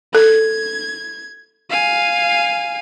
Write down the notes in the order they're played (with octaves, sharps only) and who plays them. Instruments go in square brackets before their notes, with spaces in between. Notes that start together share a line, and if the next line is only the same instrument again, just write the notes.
[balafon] A4 [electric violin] G#6
[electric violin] F5 G#5